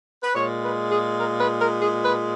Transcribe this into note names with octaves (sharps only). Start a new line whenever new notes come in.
B4
A#2 G#3 C#5
B4
G#4
A#4
B4
A#4
G#4
B4